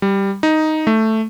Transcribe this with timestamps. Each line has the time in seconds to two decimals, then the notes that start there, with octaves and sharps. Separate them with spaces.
0.02 G3
0.43 D#4
0.87 A3